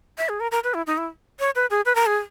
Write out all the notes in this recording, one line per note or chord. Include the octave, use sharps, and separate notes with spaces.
E5
G#4
A#4
A#4
B4
E4
D#4
E4
C#5
B4
G#4
B4
A#4
G#4